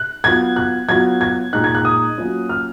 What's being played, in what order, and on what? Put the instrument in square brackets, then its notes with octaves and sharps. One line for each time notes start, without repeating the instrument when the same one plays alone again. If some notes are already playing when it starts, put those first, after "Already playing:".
Already playing: [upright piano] F#6
F#3 B3 F4 G#6
F#6
F#3 B3 F4 G#6
G#6
A#2 G#3 D#4 F#6
G#6
F#6
D#6
F#3 A#3 C#4 F4
F6